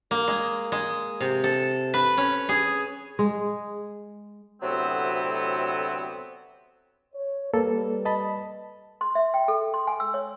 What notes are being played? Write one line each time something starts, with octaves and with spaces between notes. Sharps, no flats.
A#3
G#3
G#3
C3
A4
B4
C#4
G#4
G#3
D2 A2 C3 F#3 B3 C4
C#5
G3 A#3 A4 B4
D#5 A5 B5
C6
E5
G5
A4
C6
G#5
E6
C#5